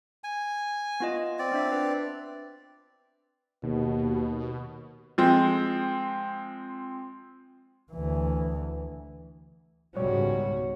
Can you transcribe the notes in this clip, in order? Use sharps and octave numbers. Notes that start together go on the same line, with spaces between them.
G#5
B3 F4 D#5
C4 D5
B3 D4 E5
B4
D#2 B2
F3 G#3 C4
D2 E3
C#2 G#2 B2 G3 F#4 C#5